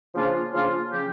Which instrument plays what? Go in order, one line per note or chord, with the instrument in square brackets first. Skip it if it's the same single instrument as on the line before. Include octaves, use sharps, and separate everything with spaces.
[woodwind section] C#3 F3 A#3 D4 F4
C#3 F3 A#3 D4 F4
C#3 F3 C#4 G4